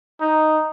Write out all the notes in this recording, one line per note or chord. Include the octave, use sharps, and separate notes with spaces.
D#4